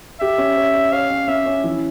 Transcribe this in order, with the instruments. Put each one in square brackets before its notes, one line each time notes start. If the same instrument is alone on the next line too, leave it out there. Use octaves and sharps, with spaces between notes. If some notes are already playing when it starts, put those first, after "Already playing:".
[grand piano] G4 [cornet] E5
[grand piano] C#4
C#5
C#5
[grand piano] C#5 [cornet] F5
[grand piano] C#4
[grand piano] C#4 [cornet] E5
[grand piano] C#4
E3